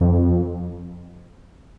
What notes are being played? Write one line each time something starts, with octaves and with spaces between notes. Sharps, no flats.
F2